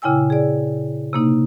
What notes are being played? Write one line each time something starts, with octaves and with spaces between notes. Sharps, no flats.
A#2 C#3 E4 G5 G#5 E6
G#4 D5
C3 A#3 D#4